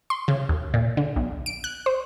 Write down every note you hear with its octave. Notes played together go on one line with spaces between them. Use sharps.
C6
C#3
D#2
A#2
D3
B1
D7
F#6
C5